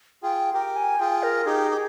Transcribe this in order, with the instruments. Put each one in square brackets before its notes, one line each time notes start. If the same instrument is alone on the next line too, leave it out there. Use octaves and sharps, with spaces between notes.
[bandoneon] F4 G#4 [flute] G5
[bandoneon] G4 A#4 [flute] G5
[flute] G#5
[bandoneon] F4 G#4 [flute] G5
[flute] A#4
[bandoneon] D#4 G4 [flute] G#4
[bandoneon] G4